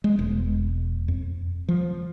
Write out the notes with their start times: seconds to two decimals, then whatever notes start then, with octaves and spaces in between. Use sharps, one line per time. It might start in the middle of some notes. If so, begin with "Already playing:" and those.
0.04 G#3
0.19 E1
1.08 F2
1.69 F3